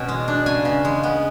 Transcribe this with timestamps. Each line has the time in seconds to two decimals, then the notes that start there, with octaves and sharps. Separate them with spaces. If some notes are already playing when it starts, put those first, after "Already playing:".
Already playing: B2 C#4 G#5
0.09 G#3
0.28 D4
0.46 C#3 G#5
0.65 C#3
0.85 G#3
1.03 B3